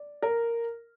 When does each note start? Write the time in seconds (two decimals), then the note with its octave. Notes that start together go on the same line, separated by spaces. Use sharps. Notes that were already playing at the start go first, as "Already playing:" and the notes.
Already playing: D5
0.22 A#4